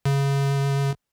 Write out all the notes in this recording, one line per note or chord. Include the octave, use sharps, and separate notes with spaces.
C#3